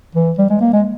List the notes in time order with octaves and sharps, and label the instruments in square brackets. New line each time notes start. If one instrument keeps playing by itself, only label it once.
[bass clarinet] E3
G3
G#3
A#3
G#3